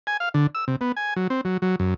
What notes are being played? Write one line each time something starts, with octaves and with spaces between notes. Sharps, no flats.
G#5
F5
D3
E6
C3
B3
G#5
F#3
C4
F#3
F#3
F#2